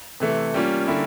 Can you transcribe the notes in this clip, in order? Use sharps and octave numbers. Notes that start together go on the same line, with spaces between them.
C3 E3 A3
G3 A#3 C#4 F4
D3 G3 A#3 C#4 E4